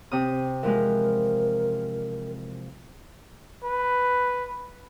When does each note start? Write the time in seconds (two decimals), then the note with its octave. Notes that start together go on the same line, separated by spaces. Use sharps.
0.11 C3 D#6
0.63 E3 F3 G#3 A#4
3.64 B4